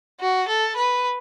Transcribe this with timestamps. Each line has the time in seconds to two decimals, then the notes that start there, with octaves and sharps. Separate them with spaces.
0.20 F#4
0.48 A4
0.76 B4